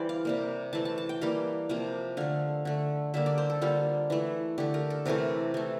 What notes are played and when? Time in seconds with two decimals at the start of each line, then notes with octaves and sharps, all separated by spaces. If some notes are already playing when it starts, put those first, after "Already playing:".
Already playing: E3 G3 C5 D5
0.09 F5
0.25 C3 G3 A#3
0.73 E3 A3 A5
0.85 A5
0.98 A5
1.09 G5
1.21 E3 G3 A#3 F5
1.69 C3 F3 A#3
2.17 D3 A3 F5
2.65 D3 A3
3.14 D3 G3 A#3 E5
3.26 D5
3.38 C5
3.50 A4
3.61 D3 G3 A#3 F4
4.10 E3 A3
4.58 D3 A3 G4
4.74 A#4
4.90 A4
5.06 C3 E3 A3 A#4
5.54 E3 A3